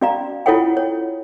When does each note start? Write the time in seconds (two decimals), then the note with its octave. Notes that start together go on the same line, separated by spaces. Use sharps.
0.01 C#4 F#4 D5 F5 A#5
0.46 E4 F4 A4 C#5 F#5 G5
0.77 C#5